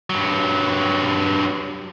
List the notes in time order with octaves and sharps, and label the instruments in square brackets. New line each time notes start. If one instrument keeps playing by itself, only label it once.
[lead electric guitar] G2 F#3